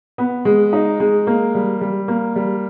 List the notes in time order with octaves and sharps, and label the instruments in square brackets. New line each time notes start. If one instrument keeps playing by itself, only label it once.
[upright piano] B3
G#3
D#4
G#3
A#3
G3
G3
A#3
G3